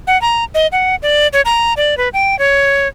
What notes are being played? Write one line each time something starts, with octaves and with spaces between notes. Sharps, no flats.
F#5
A#5
D#5
F#5
D5
C#5
A#5
D5
B4
G5
C#5